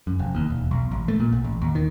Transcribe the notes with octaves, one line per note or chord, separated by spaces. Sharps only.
F#2
F1
D#2
E1
B1
A1
A3
A#2
B1
A1
D#2
D#3